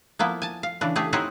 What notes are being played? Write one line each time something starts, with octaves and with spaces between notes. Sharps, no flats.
F3 A#3 B3 E4
G#5 A5
F5
C#3 E3 D4
A3 G4 G#4
C4 D#4 E4 F#4 C5 C#5